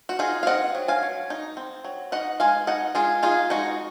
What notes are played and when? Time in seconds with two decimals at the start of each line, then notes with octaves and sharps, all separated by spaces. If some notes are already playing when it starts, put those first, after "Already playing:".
0.09 F#4
0.19 D#4 F4 G#4
0.43 F5
0.46 C4 D#5 F#5
0.75 F#3
0.88 F5 G#5
1.03 F#3
1.30 D#4
1.57 C4
1.85 F#3
2.12 D#4 D#5 F#5
2.40 G#3 F5 G#5
2.67 D#4 D#5 F#5
2.95 G#3 F4 G#4
3.23 D#4 F4 G#4
3.50 G#3 D#4 F#4